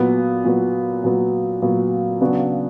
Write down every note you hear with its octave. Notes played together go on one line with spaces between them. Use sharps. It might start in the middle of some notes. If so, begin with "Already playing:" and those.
Already playing: A#2 F#3 B3
A#2 F#3 B3
A#2 F#3 B3
A#2 F#3 B3
C#3 F#3 B3 D4 F#4